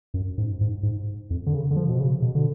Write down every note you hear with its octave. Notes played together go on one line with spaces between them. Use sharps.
F#2
G#2
G#2
G#2
F2
D3
C#3
D3
F3
B2
C#3
B2
D3